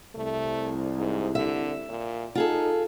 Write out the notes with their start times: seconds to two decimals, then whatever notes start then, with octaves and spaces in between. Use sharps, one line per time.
0.15 C2 A3
0.98 G#2
1.35 D3 E5
1.89 A#2
2.35 D#4 F4 G#4 A4